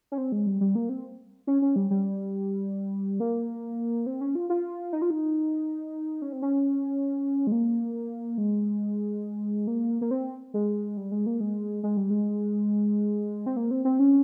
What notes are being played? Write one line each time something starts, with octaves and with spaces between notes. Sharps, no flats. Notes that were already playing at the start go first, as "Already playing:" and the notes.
C#4
C4
G#3
G3
G3
A#3
C4
C#4
C#4
G3
G3
A#3
C4
C#4
F4
F4
D#4
F4
D#4
C#4
C4
C#4
G#3
A#3
G#3
A#3
A#3
C4
G#3
G3
G#3
A#3
G#3
G#3
G3
G#3
C4
A#3
C4
C4
C#4